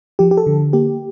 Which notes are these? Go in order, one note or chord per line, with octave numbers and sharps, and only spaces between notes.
F3 G4
G4
A4
D3
A#3 G4